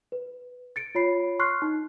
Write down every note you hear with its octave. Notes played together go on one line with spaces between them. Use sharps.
B4
A6 C#7 D7
F4 C#5 B5 C7
C6 C#6 F6 F#6 C7
D#4